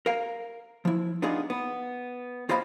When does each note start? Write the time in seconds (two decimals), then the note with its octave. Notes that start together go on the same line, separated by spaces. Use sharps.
0.06 A#4 F5
0.85 F3 E4
1.22 B3 D4 D#4 F4 G#4 D#5
1.50 B3
2.49 D#2 F4 C5 D#5 F5 B5